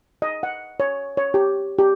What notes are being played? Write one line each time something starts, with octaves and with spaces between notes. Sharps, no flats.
D#5
F#5
C#5
C#5
G4
G4